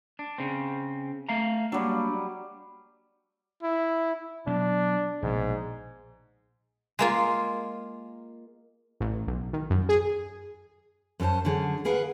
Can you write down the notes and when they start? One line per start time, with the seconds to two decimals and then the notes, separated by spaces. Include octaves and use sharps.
0.19 D4
0.38 C#3 C4
1.29 A3 F5 A#5
1.72 F#3 G3 A#3 D4
3.63 E4
4.47 B2 F#3 D4
5.23 A#1 G#2 B2
6.99 G#3 A#3 F4
9.00 A1
9.27 B1
9.53 D#3
9.70 F#2
9.89 G#4
11.20 F#2 C#4 A4 C5 A5
11.45 D3 F#3 C#4 G#4
11.85 G#4 A#4 B4 F5 F#5